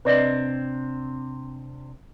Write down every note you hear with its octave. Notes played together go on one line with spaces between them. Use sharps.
C3 C4 D4 B4 D5 D#5